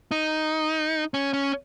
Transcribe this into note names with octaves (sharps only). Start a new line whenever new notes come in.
D#4
C#4
C#4